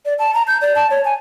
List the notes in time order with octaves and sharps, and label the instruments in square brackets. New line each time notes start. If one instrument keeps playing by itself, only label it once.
[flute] D5
A5
A#5
G6
D5
A5
C#5
G#5